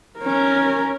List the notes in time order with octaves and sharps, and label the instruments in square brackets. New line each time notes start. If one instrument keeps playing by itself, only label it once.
[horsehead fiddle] C#4 A#4